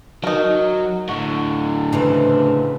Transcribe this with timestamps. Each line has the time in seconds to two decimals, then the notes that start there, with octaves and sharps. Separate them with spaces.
0.24 F#3 D#4 A#4
1.09 A2 D3 F#4
1.93 C#3 E3 C4